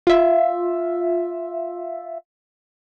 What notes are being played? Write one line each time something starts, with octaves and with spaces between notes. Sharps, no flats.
F4 E5